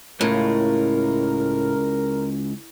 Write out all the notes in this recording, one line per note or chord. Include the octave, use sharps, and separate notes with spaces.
C#2 A2 A#4